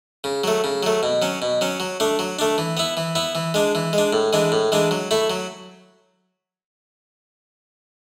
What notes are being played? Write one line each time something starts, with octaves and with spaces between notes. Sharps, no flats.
C#3
F#3 A3
C#3
F#3 A3
B2
F#3 C#4
B2
F#3 C#4
F#3
A3 D4
F#3
A3 D4
E3
B3 E4
E3
B3 E4
E3
G#3 D4
E3
G#3 D4
A2
E3 G#3 D4
A2
E3 G#3 D4
F#3
A3 E4
F#3